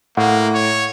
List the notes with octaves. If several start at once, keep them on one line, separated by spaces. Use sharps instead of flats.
A2 A#3 F#5
C#5